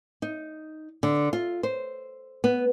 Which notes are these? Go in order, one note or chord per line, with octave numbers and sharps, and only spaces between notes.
D#4
D3
F4
C5
B3